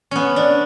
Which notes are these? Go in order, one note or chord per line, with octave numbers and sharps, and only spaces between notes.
B3 C#4
D4